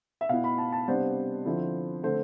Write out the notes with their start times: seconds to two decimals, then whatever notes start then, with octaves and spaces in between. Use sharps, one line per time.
0.21 E5
0.29 B2 B3 E4 F5
0.44 B5
0.58 A5
0.73 A5
0.88 C3 G3 B3 D4 C5
1.45 D3 F3 C4 E4
2.03 D3 A3 C4 C5